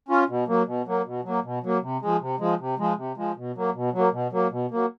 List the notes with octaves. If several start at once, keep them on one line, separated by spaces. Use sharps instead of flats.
C#4 F4
B2
F#3 A#3
B2
F#3 A#3
B2
F#3 A#3
B2
F#3 A#3
C3
F3 G#3
C3
F3 G#3
C3
F3 G#3
C3
F3 G#3
B2
F#3 A#3
B2
F#3
A#3
B2
F#3 A#3
B2
F#3 A#3